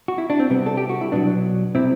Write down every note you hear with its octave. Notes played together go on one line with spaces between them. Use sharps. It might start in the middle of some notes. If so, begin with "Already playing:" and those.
F#4
E4
D4
C4
C3 G3 B3
A4
G4
F#4
E4
B2 F#3 B3 D4
C3 G3 C4 E4